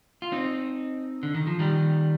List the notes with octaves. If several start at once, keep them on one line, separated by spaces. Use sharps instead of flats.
F4
C4 D#4
D3
D#3
F3
D#3 G3